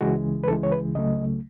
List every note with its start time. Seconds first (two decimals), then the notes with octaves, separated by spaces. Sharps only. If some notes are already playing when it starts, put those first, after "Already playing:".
0.01 C#2 C#3 E3 G#3 F#4
0.44 B4
0.48 C#2 C#3 E3 G#3 A4
0.63 C#5
0.72 B4
0.95 C#2 C#3 F#3 A3 D#5